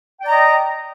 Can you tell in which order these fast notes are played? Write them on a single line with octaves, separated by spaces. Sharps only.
G5 D5 A#5 D#5